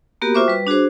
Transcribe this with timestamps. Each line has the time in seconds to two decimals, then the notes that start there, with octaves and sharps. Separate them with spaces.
0.22 A#3 B3 F#4 G4 A#4
0.35 F4 F#4 C5 E5 C#6 D6
0.48 G3 B4
0.67 D4 F#4 G#4 C5